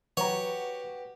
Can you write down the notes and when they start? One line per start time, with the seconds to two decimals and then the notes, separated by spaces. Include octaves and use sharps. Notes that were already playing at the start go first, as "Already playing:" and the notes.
0.17 E3 F#3 F#4 G4 B4 C#5 F#5 A#5